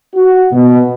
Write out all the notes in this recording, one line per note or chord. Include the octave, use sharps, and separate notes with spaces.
F#4
B2